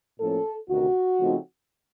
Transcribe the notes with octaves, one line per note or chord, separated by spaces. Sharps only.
A2 F3 A#3 C#4 A4
D2 C3 D#3 F#4
C#3 F3 A3 C4 D#4